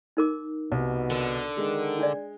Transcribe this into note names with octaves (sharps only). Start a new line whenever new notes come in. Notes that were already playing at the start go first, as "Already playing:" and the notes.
D#4 A#4 D6
C2 B2
D3 A#4
D#3 G#3
D4 D5